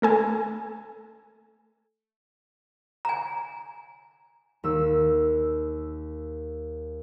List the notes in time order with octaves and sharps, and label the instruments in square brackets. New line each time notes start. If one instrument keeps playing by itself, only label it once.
[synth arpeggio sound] A3 A4 G#5
[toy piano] G#5 A#5
[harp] D#2 E6